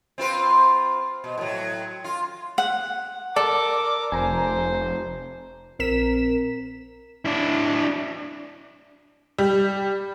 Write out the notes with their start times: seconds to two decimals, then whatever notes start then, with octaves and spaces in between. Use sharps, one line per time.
0.18 C4 F4 B4
1.24 B2
1.38 A2 F#3
2.04 F4
2.58 F#5
3.36 A4 A#4 D5 D6
4.12 F1 C5 G#5 A#5
5.79 A#1 C4 A#4 B6 E7
7.25 D4 E4
9.38 G3